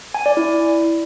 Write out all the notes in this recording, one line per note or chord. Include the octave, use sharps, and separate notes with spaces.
G#5
D5
E4